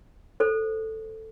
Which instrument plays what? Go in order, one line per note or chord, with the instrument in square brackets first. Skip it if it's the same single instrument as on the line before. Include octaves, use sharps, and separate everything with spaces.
[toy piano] A4 C5